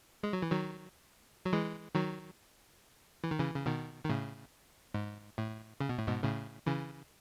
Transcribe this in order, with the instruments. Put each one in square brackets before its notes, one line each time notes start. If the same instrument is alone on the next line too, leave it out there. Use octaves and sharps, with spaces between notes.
[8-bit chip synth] G#3
F#3
E3
D#3 F#3
F#3
E3 G#3
D#3 F#3
E3
D#3
C#3 E3
C#3
B2 D#3
D#3
A2 C#3
G#2
A2
C#3
B2
A2
G#2 B2
A2 C#3
C#3 E3